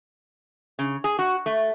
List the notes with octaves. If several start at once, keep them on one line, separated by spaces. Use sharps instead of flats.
C#3
G#4
F#4
A3